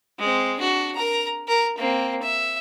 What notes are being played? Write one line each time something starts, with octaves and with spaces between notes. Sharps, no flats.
G#3 C4
D4 F#4
A#4 A#5
A#4
A#3 C4
E5